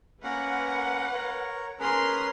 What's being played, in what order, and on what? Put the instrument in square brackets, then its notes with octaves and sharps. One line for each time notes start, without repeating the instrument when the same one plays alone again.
[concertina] A#3 C#4 A#4 [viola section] B4 F#5
[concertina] A#4 C#5
[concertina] C#4 G#4 B4 [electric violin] A#4 C6